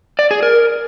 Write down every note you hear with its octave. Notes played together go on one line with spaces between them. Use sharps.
D5
G#4
A#4